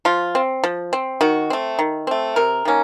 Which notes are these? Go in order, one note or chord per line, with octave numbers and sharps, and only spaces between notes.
F3 F4
C4
F3
C4
D#3 F#4
A3 C4
D#3
A3 C4
C3 A#4
D#3 A#3 C#4